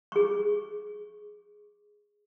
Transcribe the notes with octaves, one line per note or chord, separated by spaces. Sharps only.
G#4 C#6